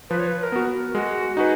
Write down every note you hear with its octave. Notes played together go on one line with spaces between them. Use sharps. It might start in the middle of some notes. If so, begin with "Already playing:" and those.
F3 B4
C#5
B4
B4
A#4
B3 F#4
G#3 F#4
D#4 F#4 G#4 B4